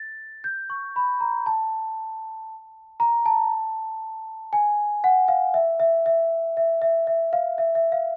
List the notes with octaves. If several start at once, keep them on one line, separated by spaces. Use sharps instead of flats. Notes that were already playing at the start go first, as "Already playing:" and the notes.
Already playing: A6
G6
C#6
B5
A#5
A5
A#5
A5
G#5
F#5
F5
E5
E5
E5
E5
E5
E5
F5
E5
E5
F5